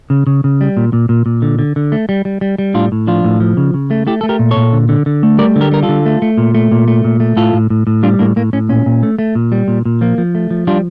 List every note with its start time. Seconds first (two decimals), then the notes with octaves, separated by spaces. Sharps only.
0.10 C#3
0.27 C#3
0.44 C#3
0.61 G3
0.77 A#2
0.93 A#2
1.09 A#2
1.26 A#2
1.42 D3
1.59 D3
1.76 D3
1.92 A3
2.09 G3
2.25 G3
2.41 G3
2.58 G3
2.74 A2 D4 F4
2.92 A2
3.07 F3 D4 F4
3.25 A2
3.40 F3
3.57 C#3
3.74 C#3
3.91 A3
4.07 A3 E4 G4
4.21 A3 A4
4.29 G4 A#4
4.39 A#2
4.51 A4 C#5
4.57 A#2
4.73 D3
4.89 D3
5.06 D3
5.23 A3
5.38 G3 A#4 D5
5.56 D3
5.61 G4 A#4
5.71 G3 A#4
5.83 F4 A4
5.89 D3
6.06 A3
6.22 A3
6.38 A#2
6.55 A3
6.72 A#2
6.88 A3
7.04 A#2
7.20 A3
7.36 A2 F4 A4
7.54 A2
7.70 A2
7.87 A2
8.03 G3 D4 F4
8.19 A2 A#3 D4
8.36 A2 A#3
8.53 A2 C#4
8.69 A#2 C#4
8.86 A#2
9.03 A3
9.19 A3
9.35 A#2
9.52 G3
9.68 A#2
9.85 A#2
10.01 F3 A#3
10.18 F3
10.35 A3
10.51 F3
10.67 G3 D4 F4